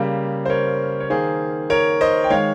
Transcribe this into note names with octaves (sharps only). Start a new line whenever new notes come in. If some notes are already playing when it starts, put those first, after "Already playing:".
Already playing: C#3 G3 A#3
C5
A#4 C#5
C#5
D#3 A#3 G#4 C5
A#4 C#5
C5 D#5
G5
D#3 G#3 C#5 F5